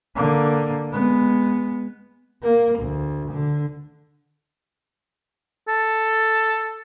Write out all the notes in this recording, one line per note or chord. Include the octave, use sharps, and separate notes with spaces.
D3 A#3
G#3 B3
A#3
D2
D3
A4